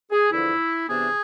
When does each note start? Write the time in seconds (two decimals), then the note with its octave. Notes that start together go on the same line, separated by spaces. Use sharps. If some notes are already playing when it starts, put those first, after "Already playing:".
0.11 G#4
0.31 E2 D3 F3 E4
0.88 C3 E3 B3 D4 G#4